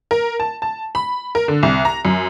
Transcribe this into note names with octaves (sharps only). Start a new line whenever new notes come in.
A#4
A5
A5
B5
A#4
D3
C2
A#5
F#2